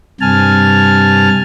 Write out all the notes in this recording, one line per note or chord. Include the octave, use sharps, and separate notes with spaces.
G2 C3 G#5 A5 F6